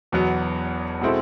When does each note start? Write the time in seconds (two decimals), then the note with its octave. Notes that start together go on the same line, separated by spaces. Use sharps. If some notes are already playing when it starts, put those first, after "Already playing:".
0.12 E1 E2 B2 F#3 B3
1.01 B2 G#3 C4 E4 A4